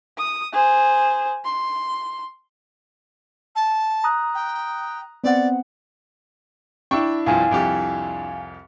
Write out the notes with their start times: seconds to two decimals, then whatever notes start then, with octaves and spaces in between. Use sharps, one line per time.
0.18 D#6
0.53 G#4 C5
1.44 C6
3.55 A5
4.04 A#5 D#6 F#6
4.34 G5
5.24 B3 C4 D5 F#5
6.91 D4 E4 G5 C#6
7.26 C2 G2 F3 F5 G#5
7.51 C2 F2 G4